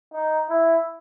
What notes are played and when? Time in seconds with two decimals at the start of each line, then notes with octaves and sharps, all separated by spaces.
0.13 D#4
0.49 E4